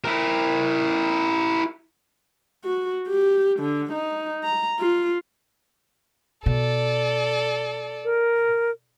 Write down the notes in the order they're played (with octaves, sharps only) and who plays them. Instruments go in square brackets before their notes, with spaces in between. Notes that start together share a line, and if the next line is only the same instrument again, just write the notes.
[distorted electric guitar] E4 A#4
[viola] F#4
G4
D3
D#4
A#5
F4
[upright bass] B2 [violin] A4 D5
[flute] A#4